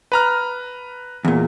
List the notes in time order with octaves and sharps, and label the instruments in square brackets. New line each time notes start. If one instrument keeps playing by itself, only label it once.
[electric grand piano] B4 A#5 F6
[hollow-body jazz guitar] E2 A#2